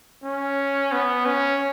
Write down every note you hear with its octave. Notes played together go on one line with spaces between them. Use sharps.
C#4
B3
C#4